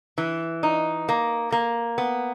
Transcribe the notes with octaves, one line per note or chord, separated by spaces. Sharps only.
E3
D#4
A#3
A#3
B3